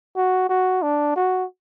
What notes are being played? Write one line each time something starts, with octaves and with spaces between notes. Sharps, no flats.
F#4
F#4
D4
F#4